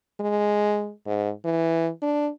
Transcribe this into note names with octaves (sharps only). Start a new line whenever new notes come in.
G#3
G#2
E3
D4